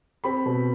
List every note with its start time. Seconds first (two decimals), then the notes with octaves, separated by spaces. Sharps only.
0.24 C4 B5
0.46 B2